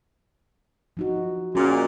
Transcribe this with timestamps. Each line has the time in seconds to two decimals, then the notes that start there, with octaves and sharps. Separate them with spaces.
0.97 F3 D#4 F#4
1.55 A#2 G#3 C#4 F#4